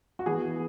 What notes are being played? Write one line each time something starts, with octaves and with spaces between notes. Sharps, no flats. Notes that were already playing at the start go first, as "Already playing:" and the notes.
F#4
E3 B3 G#4